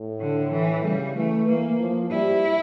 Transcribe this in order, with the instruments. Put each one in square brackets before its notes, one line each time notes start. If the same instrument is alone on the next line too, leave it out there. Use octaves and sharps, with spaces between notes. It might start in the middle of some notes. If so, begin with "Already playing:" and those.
Already playing: [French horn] A2
[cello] D3
E3
[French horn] C#3 [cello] G3
[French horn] E3 [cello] A3
[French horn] E3 [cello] A#3
[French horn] F3
[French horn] G3 [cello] E4